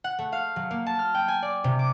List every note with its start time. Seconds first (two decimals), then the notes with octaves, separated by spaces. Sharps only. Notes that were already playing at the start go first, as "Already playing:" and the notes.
0.04 F#5
0.19 A3
0.32 F5
0.56 F#3
0.71 A#3
0.86 A5
0.99 F6
1.14 G5
1.28 G#5
1.43 D5
1.64 C3
1.79 D6